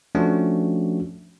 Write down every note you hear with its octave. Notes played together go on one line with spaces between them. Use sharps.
F3 A3 C#4 D4 F#4